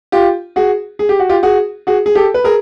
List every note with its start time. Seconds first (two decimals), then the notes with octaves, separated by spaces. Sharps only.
0.12 F4 G4
0.56 F#4 G#4
0.99 G#4
1.09 G4
1.20 F#4
1.29 F4 G4
1.43 F#4 G#4
1.87 F#4 G#4
2.06 G#4
2.15 G4 A4
2.34 B4
2.44 G#4 A#4